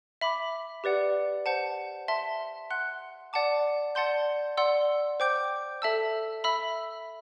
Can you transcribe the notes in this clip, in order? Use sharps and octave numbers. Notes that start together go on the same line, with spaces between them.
E5 B5 D6
G4 B4 D5 F#5
C5 F#5 A5
E5 A5 C6
F#5 C6 F#6
D5 F#5 A5 D6
D5 F#5 A5 C6 G6
D5 F#5 C6 E6
C5 G5 D6 G6
A4 E5 A5 E6
E5 B5 E6